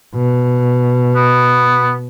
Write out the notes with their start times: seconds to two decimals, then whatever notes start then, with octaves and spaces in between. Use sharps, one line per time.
0.15 B2
1.15 B3